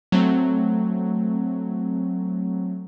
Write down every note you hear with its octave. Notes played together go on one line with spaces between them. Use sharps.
F#3 A3 C4